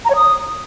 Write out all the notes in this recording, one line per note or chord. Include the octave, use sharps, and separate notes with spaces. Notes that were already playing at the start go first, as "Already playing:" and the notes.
A#5
C#5
D#6